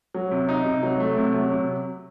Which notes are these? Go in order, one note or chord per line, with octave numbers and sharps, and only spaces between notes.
F#3
C3
D#4
C3
F#3
A3
C3
F#3
C3